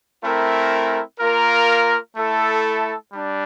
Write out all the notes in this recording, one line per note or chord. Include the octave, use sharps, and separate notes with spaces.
A3 C4 E4 A#4
A#3 F4 A#4
A3 E4 A4
G3 D4